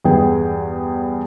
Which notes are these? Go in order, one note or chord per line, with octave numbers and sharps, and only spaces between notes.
E2 G2 B3 G#4 G5